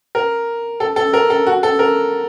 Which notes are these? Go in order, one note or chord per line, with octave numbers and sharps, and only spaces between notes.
A#4
A4
A4
A#4
A4
F#4
A4
A#4